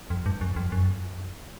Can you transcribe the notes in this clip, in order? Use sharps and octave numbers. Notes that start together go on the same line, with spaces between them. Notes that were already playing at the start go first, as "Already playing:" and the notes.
F2
G2
F#2
F2
F#2